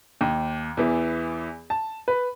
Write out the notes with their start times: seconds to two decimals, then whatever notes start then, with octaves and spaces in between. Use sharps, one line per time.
0.21 D#2
0.77 E2 E3
1.70 A5
2.08 B4